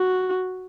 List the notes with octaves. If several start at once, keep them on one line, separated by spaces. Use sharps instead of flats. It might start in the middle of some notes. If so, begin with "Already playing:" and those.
Already playing: F#4